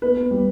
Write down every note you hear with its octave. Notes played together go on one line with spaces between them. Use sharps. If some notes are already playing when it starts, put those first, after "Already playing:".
B3 B4
B3
G3